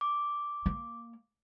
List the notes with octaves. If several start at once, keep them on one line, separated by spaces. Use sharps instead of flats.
D6
A#3